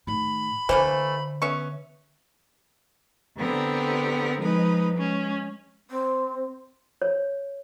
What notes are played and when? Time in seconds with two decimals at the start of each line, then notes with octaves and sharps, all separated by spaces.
0.07 A2 D#3 B5
0.69 D3 E3 A3 A#3 C5
1.42 B3 C#4 E5 C#6
3.37 D3 B3 C4 G4 A#4
4.39 F3 G#3 D#4 B4
4.94 G#3 C#4
5.90 C4
7.02 C#5